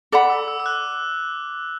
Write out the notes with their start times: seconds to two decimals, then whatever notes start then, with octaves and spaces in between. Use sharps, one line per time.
0.12 A4 D5 F#5 B5 D6
0.30 E6
0.48 E6
0.60 E6
0.66 F#6